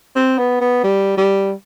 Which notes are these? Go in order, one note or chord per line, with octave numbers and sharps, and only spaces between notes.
C4
B3
B3
G3
G3